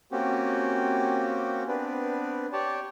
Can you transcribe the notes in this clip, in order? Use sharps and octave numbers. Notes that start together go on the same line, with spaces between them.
A#3 C4 C#4 F#4 G4
B3 C4 D4 B4
G4 C#5 D5 A5